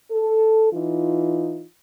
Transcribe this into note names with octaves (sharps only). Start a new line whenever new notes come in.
A4
E3 D#4 F4